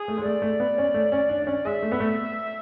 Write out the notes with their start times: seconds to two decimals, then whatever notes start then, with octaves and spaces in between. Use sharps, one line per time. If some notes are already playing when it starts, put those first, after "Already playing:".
Already playing: G#4
0.08 A3
0.17 G#3
0.25 A3 D5
0.42 A3
0.60 B3
0.78 C#4
0.94 A3
1.12 C#4
1.29 D4
1.42 D4
1.47 C#4
1.65 G#3 E5
1.83 A3
1.92 B3
2.00 A3